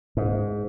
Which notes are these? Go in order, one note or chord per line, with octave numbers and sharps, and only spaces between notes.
G#2